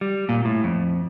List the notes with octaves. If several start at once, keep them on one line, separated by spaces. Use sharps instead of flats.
G3
A#2
A2
F2